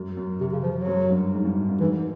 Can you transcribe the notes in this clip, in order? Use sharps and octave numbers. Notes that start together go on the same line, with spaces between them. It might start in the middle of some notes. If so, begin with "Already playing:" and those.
Already playing: F#2
F#2
C3
C#3
F3
F#3
F#2
G2
G#2
G2
G2
G#2 E3